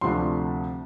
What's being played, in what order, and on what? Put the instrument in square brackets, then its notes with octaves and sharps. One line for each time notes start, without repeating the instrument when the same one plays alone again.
[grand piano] D2 C3 F3 A3 D4 C6